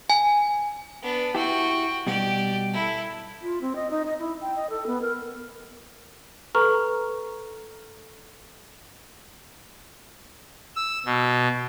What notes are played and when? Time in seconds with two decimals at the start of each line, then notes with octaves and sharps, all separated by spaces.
0.10 G#5
1.02 B3 D4
1.35 E4 F#4 G4 G5
2.07 B2 G3 G4 D5
2.73 E4 A4
3.42 F4
3.61 C4
3.76 D#5
3.91 D#4
4.06 D#5
4.19 E4
4.41 G5
4.56 D#5
4.70 A4
4.87 B3
5.02 A#4
6.55 A4 B4 A#5 C#6 F6
10.76 E6
11.06 B2